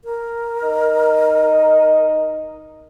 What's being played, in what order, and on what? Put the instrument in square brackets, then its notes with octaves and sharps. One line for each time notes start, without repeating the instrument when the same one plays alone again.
[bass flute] A#4
[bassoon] D#4